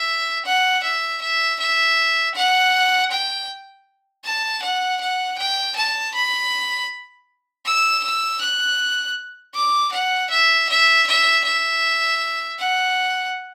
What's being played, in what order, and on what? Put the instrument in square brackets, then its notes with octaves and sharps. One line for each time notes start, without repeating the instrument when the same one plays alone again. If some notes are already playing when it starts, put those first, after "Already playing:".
Already playing: [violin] E5
F#5
E5
E5
E5
F#5
G5
A5
F#5
F#5
G5
A5
B5
E6
E6
F#6
D6
F#5
E5
E5
E5
E5
F#5